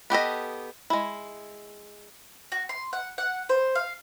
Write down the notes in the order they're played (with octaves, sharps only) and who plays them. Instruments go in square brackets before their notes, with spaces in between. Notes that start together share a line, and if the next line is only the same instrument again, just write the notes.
[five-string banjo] B3 G4 A4 D#5
G#3 E4
[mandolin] F#4
C6
F#5
F#5
C5
F5